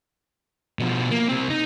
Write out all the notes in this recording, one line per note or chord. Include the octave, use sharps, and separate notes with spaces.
B2 F3
A#3
C2 C4
D#4